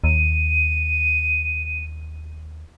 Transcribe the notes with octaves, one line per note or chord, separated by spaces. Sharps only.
D#2 D#7